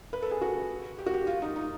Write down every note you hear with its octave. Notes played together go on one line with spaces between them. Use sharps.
B4
A4
G#4
F#4
G4
F#4
G4
F4
D#4
D#4